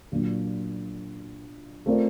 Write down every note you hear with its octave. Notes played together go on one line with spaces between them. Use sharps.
A#2 F#3 A#3 D4 F4
A3 C4 F4 A#4 D5